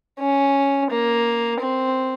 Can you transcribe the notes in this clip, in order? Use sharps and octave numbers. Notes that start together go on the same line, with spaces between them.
C#4
A#3
C4